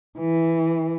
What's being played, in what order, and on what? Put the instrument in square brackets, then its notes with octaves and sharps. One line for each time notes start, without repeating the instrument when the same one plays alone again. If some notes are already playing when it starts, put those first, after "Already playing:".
[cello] E3